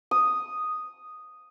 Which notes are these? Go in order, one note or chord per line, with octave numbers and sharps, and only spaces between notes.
D#6